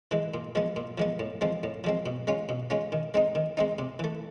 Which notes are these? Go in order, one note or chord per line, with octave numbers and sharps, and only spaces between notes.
E3 G#3
A#2
F3 G#3 B3
A#2
F3 G#3 B3
A2
F3 G#3 C4
A2
F3 G#3 C4
B2
G#3 C#4 F4
B2
G#3 C#4 F4
D#3
G#3 C4 D#4
D#3
G#3 C4 D#4
C3
E3 A3